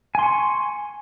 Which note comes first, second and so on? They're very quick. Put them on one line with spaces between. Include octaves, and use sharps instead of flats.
G#5 C6 C#6